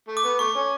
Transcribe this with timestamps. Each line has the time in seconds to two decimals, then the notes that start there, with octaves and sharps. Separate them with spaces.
0.08 A3
0.17 D6
0.24 B3
0.39 A3 C#6
0.55 C#4